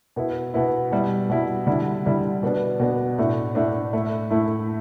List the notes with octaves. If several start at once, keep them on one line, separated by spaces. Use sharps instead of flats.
B2 B3 E4
B2 B3 E4
B2 G3 E4
B2 G3 E4
D3 G3 E4
D3 G3 E4
B2 B3 D4
B2 B3 D4
A2 A3 D4
A2 A3 D4
A2 A3 E4
A2 A3 E4